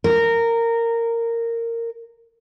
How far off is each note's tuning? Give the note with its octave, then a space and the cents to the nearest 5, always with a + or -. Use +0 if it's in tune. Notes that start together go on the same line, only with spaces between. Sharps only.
A#4 -15